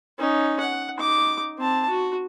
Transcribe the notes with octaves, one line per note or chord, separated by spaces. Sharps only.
C#4 D#4
F#5
D#4 D6
C4 A5
F#4